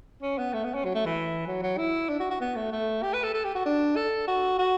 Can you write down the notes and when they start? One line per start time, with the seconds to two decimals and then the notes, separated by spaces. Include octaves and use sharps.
0.22 C#4
0.38 B3
0.54 A3
0.64 B3
0.74 C#4
0.85 F#3
0.95 A3
1.05 E3
1.47 F#3
1.62 F#3
1.78 E4
2.09 D4
2.20 F#4
2.30 F#4
2.40 B3
2.56 A3
2.72 A3
3.03 G4
3.13 B4
3.23 A4
3.34 A4
3.44 G4
3.55 F#4
3.65 D4
3.96 A4
4.28 F#4
4.59 F#4